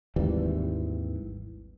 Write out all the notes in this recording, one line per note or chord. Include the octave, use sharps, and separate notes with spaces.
G#1 D#2 E3 G3